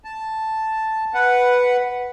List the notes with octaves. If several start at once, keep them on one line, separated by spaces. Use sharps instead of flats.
A5
B4 F#5